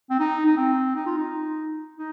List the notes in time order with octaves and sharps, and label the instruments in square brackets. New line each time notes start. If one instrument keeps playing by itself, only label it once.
[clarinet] C4
D#4
D#4
C4
D#4
F4
D#4
D#4